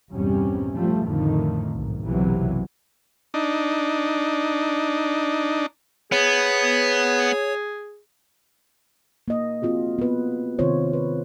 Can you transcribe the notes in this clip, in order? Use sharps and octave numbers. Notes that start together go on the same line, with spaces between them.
A#1 E2 G2 C3 G3 C#4
F3 G3 A3
A1 F2 A2 D3 D#3 A3
B1 G#2
F#1 B1 C3 E3 F#3
D4 D#4
B3 G#4 C#5
A#3 D#5
C4 F4 F#4 G#4
B3 B4
C3 D#3 C4 F4 C5 C#5
B4